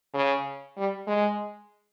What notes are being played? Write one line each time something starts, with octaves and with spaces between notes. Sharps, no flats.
C#3
G3
G#3